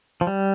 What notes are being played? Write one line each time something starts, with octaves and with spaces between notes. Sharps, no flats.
F3
G3